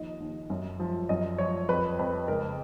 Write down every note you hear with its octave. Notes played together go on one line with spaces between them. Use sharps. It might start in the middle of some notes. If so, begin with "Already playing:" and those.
Already playing: D#2 F3 D#5
D#2
F#2
F3
F#2 D#5
F3 C#5
F2 B4
F2 B4
C#2 A#4